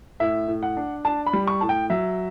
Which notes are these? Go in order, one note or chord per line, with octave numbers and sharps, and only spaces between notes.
A2 E5
A2
F#5
D4
D4 A5
B5
G3
C#6
A2 A5
G5
F#3 E5